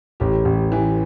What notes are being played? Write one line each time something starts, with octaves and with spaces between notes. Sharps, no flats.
A1 G4
A1
E3